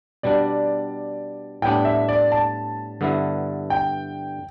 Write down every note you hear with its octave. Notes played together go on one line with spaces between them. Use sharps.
B2 G3 D4 D5
A2 G3 B3 D4 G5
E5
D5
A5
G2 D3 B3 E4
G5